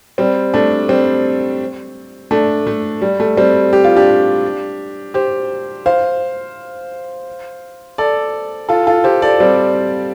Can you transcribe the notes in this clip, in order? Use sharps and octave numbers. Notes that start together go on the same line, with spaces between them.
G3 C4
A3 D4
G3 C4
A3 D4
A3
G3
A3
G3 C4
G4
F4
D4 G4
G4 C5
C5 F5
A4 D5
F4 A4
F4 A4
G4 C5
A4 D5
G3 C4